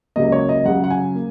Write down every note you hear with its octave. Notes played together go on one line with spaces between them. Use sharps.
C#2 C#3 F#3 A#3 D#5
C#5
D#5
F#2 C#3 F#3 F#5
F#5
G#5
A#3